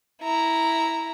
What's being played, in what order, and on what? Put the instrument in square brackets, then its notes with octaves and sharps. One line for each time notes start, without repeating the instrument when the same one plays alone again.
[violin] E4 A#5